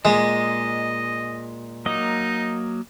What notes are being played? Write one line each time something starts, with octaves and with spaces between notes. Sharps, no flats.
A#2 G#3 D#5
F#3 A#3 D#4 D#5